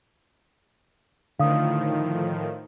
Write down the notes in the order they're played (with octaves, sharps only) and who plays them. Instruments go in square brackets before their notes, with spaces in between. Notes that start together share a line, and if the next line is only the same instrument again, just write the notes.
[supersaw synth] A2 D#3 F3 [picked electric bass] D3 [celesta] F5 D#6